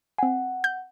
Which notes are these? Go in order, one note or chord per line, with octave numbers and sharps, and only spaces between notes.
C4 F#5 G#5
G6